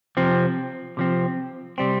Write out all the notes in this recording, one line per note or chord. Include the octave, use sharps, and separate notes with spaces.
C3 F3 C4
C3 F3 C4
C3 G3 C4